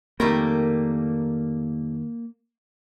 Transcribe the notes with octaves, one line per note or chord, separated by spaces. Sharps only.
F2 D#3 G3 A3 A#3 A#4